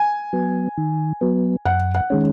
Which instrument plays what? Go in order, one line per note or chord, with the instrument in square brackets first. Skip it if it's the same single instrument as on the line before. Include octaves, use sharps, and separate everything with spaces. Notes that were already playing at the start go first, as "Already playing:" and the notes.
Already playing: [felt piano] G#5
[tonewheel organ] F#3 B3
D#3
F#3 B3
[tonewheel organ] F#2 [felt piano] F#5
[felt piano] F#5
[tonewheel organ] D#3 G#3 C#4